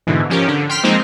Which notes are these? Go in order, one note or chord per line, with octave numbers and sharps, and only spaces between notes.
G#2 B2 D3 E3
F3 C#4 G4 A#4
D3
G5 C6 F6 B6
F3 G#3 A#3 C4 D#4